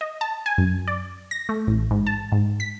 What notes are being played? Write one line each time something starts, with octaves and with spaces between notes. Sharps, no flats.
D#5
A5
G#5
F#2
D5
A#6
A3
A1
G#2
A5
G#2
B6